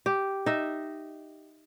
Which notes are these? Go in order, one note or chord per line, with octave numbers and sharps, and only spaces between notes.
G4
D#4 E5